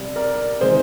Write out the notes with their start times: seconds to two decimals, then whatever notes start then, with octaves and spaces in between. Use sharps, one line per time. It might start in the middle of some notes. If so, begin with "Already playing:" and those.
Already playing: C3 G3
0.16 A#4 D5
0.61 C3 D#3 G#3 G#4 C5